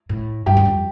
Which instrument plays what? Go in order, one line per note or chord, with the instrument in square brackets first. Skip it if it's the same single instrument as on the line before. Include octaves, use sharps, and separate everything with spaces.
[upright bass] A2
[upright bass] G2 [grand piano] G4
[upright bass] E2
F2